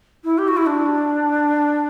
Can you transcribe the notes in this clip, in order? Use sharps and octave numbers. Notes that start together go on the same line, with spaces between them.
E4
G4
F#4
E4
D4